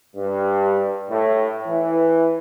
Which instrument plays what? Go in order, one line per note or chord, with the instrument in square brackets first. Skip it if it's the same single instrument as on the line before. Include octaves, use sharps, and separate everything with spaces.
[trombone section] G2
A2
E3